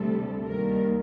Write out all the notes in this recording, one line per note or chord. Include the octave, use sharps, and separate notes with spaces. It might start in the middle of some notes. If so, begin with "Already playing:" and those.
Already playing: D2 C3 G3 A4
D#2 D#3 G3 A#4